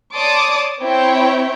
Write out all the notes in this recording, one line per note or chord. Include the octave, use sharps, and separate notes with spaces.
C#5 D5 A5 C6 D6 D#6
C4 E4 C#5 G5